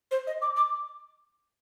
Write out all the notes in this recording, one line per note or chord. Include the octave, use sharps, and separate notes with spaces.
C5
D#5
D6
D6